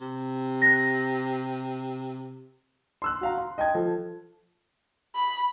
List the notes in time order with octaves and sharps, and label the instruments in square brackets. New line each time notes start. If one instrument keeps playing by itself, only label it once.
[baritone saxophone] C3
[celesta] F#6 A#6
[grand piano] C6 E6 F#6
F#4 F5 A#5
C6
D#5 G5 A5 G#6
F3 A4
[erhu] B5